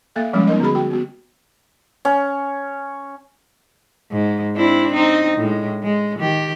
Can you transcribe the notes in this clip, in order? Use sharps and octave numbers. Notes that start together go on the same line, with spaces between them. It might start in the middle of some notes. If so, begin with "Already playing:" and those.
A#3 A4 E5 F5
F3 G3 G#3 A#3 C#4
B3 D#4 A#4 D#5
D3 F#4 G#4 B5
F#4 G5
B3 F#4
C#4
G#2
C4 D4 E4
C4 D#4
A2 G#3
G#3
D#3 G4